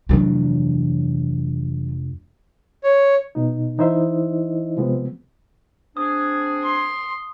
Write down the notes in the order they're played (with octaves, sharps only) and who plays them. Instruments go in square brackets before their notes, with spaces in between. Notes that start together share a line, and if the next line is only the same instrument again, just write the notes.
[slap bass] F1 F2 D4 [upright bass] E3 F#3
[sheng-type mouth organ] C#5
[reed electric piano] B2 D#4
E3 D#4 E4 C5 D#5 E5
C3 F3 G#3 B3 C4
[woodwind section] C4 D4 G#4 [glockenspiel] D#6
[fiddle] C6